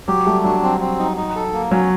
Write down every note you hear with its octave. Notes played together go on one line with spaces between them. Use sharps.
F#3 G4
G3 A3
F#3 D4
C4
C4
D#4
D#4
A4
A#3
F#3 C#4